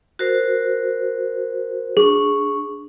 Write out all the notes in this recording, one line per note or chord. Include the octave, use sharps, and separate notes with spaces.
F#4 A#4 C5
D4 G#4 C#6